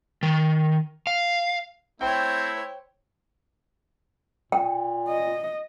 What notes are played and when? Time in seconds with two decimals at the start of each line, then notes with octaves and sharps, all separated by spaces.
0.23 D#3
1.07 F5
2.01 A3 C4 E4 C5 C#5 G5
4.52 A#2 G5
5.08 D#5